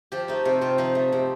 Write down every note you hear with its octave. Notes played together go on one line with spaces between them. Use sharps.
F3 G4
A3 D#4
C3 F4
C3 F4
F3 D#4
A3
C3